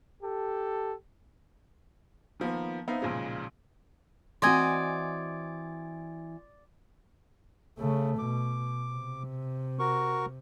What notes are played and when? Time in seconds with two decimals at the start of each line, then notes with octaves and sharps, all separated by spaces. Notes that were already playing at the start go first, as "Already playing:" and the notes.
0.23 G4 A4
2.40 D#3 F3 A#3 B3
2.88 B3 C4 D#4 E5 F5
3.02 B1 A#2 C#3 F3 G#3
4.42 E3 C4 F#4 D5 D#5 G#5 C6 G#6
7.78 C#3 A3
8.18 B2 D6
8.92 C3
9.79 F#4 A#4 C#6